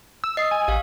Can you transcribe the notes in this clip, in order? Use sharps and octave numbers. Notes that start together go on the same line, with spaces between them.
E6
D#5 D#6 E6 C7
G#5
A1 G4 F5